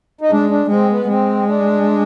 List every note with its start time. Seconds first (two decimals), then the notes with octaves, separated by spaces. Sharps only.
0.21 D#4
0.30 G#3 D4
0.50 D4
0.69 G#3 C4
0.90 B3
1.09 G#3 C4
1.48 D4